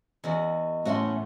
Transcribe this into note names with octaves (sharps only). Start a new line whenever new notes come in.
E2 F#4 D#5
A2 A3 C#4 F#4 E5 F#5 C6